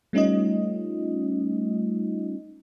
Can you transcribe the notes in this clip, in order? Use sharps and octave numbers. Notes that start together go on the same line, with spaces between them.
G3 A3 C#4 D#4 F4 D#5